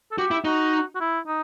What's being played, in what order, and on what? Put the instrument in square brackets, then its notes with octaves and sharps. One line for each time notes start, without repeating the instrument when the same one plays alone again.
[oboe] A4
[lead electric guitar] F#4 [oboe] G4
[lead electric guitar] E4
[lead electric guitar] D#4 [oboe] F#4
[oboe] F#4
E4
D#4